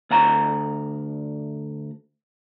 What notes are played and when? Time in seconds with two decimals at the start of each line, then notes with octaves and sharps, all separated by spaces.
0.11 D2 F#5 A#5